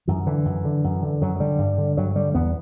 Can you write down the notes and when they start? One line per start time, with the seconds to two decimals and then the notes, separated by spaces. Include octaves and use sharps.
0.07 F#2 E3
0.27 D3 E3
0.45 F#2
0.65 D3
0.84 F#2
1.02 D3
1.21 F#2 F#3
1.40 D3 G3
1.58 G2
1.78 D3
1.97 G2 F#3
2.15 D3 G3
2.34 E2 B3